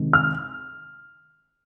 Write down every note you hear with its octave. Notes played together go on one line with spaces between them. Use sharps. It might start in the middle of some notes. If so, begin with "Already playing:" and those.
Already playing: C3 D#3 G#3
F6